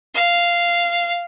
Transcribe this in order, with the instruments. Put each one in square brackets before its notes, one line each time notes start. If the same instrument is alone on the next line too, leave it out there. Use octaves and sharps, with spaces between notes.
[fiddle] F5